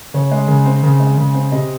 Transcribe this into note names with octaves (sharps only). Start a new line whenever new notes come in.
C#3 C#5
G#3
C#3
C4
C#3
G#3
C#3
C4
C3 D#5